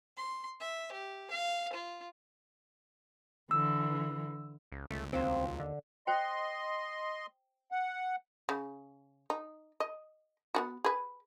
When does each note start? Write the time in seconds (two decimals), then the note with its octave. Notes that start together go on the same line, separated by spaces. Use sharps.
0.17 C6
0.60 E5
0.92 G4
1.31 F5
1.73 F4
3.51 D3 E3 E6
4.72 C#2
4.91 C#2 A3
5.13 D#2 F#3 C4 F4 C5
5.60 D3
6.07 C5 D#5 G5 C6
7.72 F#5
8.49 C#3
9.30 D#4
9.80 D#5
10.55 B3 F4 F#4
10.84 G#4 B4